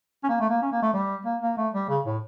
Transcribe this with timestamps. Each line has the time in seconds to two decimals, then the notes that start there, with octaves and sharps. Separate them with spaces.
0.24 C#4
0.29 A#3
0.40 A3
0.50 A#3
0.62 C#4
0.72 A#3
0.82 A3
0.94 G3
1.25 A#3
1.42 A#3
1.57 A3
1.74 G3
1.89 C#3
2.06 A2